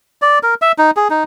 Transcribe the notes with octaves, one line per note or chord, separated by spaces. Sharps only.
D5
A#4
E5
D#4
G#4
D#4